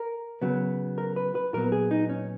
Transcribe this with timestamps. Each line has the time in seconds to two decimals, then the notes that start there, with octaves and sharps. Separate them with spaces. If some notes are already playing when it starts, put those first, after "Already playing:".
Already playing: A#4
0.42 C#3 F#3 B3
0.98 A#4
1.16 B4
1.35 B4
1.53 A#2 F#3 B3 A#4
1.72 G#4
1.91 D#4
2.09 C#4